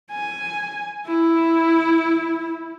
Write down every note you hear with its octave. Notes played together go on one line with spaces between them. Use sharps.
G#5
E4